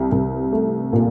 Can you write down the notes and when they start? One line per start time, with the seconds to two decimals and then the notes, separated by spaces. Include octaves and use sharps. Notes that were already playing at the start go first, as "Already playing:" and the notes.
Already playing: C2
0.12 C2
0.52 A3
0.93 A#2